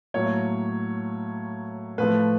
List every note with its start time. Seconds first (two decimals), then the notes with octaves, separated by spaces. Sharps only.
0.14 A2 F#3 A#3 C#5
1.98 A2 F3 A3 B4